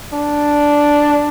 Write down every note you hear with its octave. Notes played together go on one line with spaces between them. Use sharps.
D4